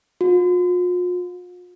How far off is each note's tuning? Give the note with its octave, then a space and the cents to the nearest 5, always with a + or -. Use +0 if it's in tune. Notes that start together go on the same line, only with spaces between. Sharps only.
F4 +45